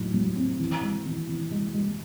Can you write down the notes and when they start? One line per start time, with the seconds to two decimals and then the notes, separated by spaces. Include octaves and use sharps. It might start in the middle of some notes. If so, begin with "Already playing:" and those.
Already playing: A2 F#3 D#4
0.14 F#3
0.36 C4
0.60 E3
0.82 G#3
1.06 E3
1.29 E3
1.51 G#3
1.74 G#3